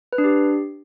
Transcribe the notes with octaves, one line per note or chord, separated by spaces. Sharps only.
B4
D4
G4